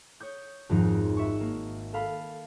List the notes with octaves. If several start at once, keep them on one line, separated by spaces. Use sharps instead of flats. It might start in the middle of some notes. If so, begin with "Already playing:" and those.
C#5 D#6 G6
G#1 F2 G#2 F3 D#4
E5 C#6
A#3
A4 F5 B5